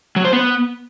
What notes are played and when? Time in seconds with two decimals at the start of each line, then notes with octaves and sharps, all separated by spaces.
0.16 F#3
0.25 C5
0.33 B3